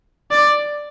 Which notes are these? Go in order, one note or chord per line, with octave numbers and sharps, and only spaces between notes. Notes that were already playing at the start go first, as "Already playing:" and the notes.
D5